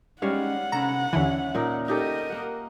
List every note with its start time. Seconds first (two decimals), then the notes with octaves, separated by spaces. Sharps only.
0.22 G3 G#3 C#4 D#4 C#5 F5 F#5
0.72 C3 C#4 A4 A#5 B5
1.13 D#2 D3 E3 C#4 C#5 E5
1.55 A#2 D#4 A#4
1.88 D#4 G4 A4 A#4 D#5
2.30 A#3 F#5